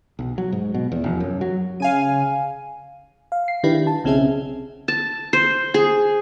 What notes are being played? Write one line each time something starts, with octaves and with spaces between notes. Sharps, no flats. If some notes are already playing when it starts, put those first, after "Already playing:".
B1
F#3
G#2
B2
E2
F1
F#2
F#3
C#3 F5 G#5 D#7
F5
C7
D#3 D4 E4 G4 B4
A5
B1 C#3 C4 C#4 G#4 E5
A5
C5
G#4